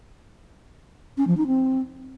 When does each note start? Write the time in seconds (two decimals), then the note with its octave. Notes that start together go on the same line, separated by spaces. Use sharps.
1.17 C#4
1.27 F3
1.37 D#4
1.47 C4